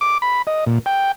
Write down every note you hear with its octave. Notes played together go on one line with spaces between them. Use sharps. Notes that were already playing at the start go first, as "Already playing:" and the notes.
D6
B5
D#5
A#2
G5